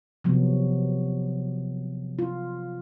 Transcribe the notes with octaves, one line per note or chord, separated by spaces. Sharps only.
C3 F3 F#3 B3
F4